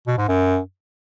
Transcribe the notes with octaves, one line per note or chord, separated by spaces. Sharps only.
B2
G#2
F#2